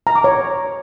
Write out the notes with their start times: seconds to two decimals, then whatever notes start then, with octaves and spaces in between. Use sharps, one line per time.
0.07 A#5
0.15 D6
0.24 C#5